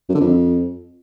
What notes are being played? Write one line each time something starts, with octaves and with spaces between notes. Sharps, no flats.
F#2
D3
F2